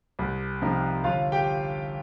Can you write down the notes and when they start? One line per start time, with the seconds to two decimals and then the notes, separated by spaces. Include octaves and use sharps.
0.19 C2
0.62 C3 F3 D#4
1.04 G1 F4 F5
1.32 G4 G5